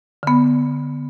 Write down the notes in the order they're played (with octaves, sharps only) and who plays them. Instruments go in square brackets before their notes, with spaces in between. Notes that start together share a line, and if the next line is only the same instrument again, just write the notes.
[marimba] D3 B3